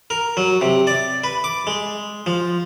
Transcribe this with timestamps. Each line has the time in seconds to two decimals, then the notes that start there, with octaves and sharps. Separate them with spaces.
0.10 A#4
0.37 F#3
0.61 C3
0.87 D5
1.24 B4
1.44 D6
1.67 G#3
2.26 F3